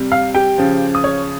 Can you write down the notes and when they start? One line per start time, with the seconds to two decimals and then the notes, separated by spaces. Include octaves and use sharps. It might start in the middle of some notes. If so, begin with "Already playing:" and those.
Already playing: C3 G3
0.12 F5
0.34 G4 G5
0.58 C#3 F3
0.95 D#6
1.04 C#5 C#6